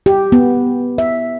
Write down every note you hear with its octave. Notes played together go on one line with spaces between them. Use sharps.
G4
B3
E5